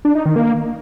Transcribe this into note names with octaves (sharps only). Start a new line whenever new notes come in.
D4
D#4
D#3
A#3